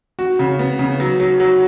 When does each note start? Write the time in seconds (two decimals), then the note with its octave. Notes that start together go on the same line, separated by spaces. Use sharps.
0.19 F#4
0.39 C#3
0.59 B3
0.79 C#3
1.00 F#3
1.20 F#3
1.40 F#3